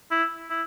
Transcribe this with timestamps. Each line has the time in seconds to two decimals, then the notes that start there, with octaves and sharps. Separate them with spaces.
0.11 E4
0.50 E4